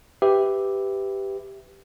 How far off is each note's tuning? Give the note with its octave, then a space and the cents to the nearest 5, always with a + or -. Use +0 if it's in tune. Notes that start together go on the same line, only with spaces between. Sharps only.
G4 +0 B4 +15 E5 -5